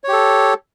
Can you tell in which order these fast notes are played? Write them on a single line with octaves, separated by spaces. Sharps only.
C#5 G4 A4